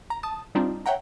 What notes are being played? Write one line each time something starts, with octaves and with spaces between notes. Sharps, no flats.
A#5
A5 D#6
G3 C4 D4 D#4 F4
C#5 E5 F#5 G5 A#5